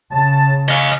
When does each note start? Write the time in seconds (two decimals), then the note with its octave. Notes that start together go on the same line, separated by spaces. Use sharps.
0.12 C#3 A5
0.69 D#5 F5 G#5 A#5 C#6